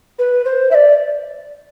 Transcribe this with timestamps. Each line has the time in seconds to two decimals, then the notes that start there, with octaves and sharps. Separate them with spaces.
0.19 B4
0.45 C5
0.71 E5
0.75 D5